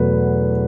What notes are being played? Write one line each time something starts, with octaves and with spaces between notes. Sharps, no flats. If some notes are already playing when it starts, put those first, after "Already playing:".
Already playing: E2 B2 F#3 A3 B4